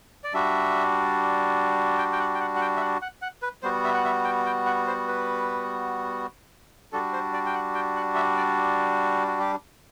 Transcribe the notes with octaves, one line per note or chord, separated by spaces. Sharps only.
D5
G3 D4 F#4 E5
G5
G5
F#5
G5
F#5
F#5
G5
E5
F#5
F#5
F#5
B4
G3 B3 F#4 C5
E5
F#5
E5
G5
G5
F#5
C5
B4
G3 D4 F#4 A4
C5
D5
G5
F#5
G5
F#5
E5
D5
F#4
G4